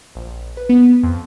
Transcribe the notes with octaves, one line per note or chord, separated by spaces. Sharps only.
A#1
B4
B3
F2